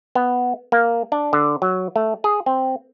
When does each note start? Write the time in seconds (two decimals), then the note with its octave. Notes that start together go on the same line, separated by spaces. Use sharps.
0.15 B3
0.72 A#3
1.12 D4
1.33 D3
1.62 F#3
1.96 A3
2.24 G#4
2.46 C4